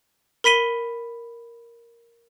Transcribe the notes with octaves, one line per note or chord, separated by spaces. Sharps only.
A#4 B5 B6 D#7 G7